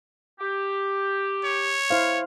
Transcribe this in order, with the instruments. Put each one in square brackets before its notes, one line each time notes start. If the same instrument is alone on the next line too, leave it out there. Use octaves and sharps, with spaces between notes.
[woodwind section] G4
[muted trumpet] C#5
[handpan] E4 C5 F5